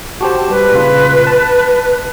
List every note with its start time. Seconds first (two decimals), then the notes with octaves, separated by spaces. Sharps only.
0.21 F#4 G4 C5 A5
0.50 G3 B4
0.71 A#2 C#3 F4
1.27 A5